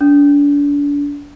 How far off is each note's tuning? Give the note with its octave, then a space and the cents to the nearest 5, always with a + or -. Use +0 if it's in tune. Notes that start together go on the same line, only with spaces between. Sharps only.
D4 -35